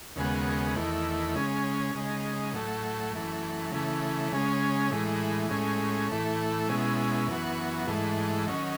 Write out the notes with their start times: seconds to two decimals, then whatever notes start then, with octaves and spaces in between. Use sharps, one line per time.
0.16 D#2 C#3 G#3 B3 F#4
0.76 E2 D#3 A3 E4
1.35 C#3 G#3 C#4
1.95 C#3 G#3 D#4
2.53 A2 F#3 A3
3.13 F#2 E3 A3
3.72 C#3 E3 A3
4.32 C#3 G#3 C#4
4.91 A2 E3 G#3
5.50 A2 G#3 C#4
6.09 A2 E3 A3
6.68 B2 G#3 C#4 E4
7.27 F#2 E3 B3 F#4
7.87 G#2 E3 A3
8.47 D#3 F#3 C#4